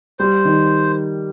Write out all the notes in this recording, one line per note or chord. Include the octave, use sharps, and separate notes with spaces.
G3 C5
D#3